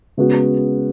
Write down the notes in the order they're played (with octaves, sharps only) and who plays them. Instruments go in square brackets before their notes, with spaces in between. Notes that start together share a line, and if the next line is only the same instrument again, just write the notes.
[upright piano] C#3 G#3 B3 F#4